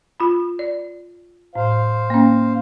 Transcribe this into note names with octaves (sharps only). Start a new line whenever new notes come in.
F4 B5
D5
A2 C5 F5
A#3 C#4